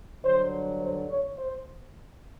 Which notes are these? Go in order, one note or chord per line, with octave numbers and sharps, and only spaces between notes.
G2 D3 F#3 C5
C5
C#5
C5